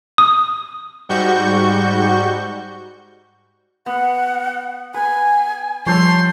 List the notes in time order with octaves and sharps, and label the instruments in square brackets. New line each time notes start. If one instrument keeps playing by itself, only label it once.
[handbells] D#6
[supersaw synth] G#2 G3 F#4 C#6 G6
[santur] B3 [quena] F#5
[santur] B4 [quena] G#5
[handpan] F3 G3 [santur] A4 C5 C#5 [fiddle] C6